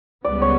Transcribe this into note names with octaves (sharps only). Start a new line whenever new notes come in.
C#2 C#3 G3 B3 D5
C#5